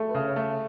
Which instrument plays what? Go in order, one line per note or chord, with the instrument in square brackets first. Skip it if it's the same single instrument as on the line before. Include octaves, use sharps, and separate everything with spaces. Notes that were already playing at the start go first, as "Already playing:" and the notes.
Already playing: [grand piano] A3 [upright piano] G#4 A4
[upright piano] B4
[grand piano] C#3
[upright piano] C#5
[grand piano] A3